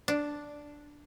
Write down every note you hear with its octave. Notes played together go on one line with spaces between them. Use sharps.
D4